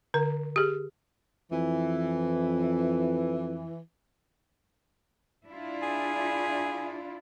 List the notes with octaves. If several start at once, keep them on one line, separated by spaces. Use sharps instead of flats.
D3 A#4
G4 G#4
F2 E3
D4 E4 F4
G#4